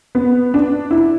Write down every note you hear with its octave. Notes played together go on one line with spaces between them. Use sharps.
B3
D4
E4